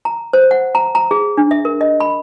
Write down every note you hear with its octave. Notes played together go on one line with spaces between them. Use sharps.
A#5
C5
F#5
A#5
A#5
G#4
D4
E5
A#4
D#5
B5